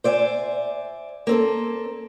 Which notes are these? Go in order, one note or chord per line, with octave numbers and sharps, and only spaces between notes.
C5 D5 E5 G#5
A#3 C4 A4